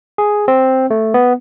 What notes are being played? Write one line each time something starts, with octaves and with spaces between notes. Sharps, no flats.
G#4
C4
A3
B3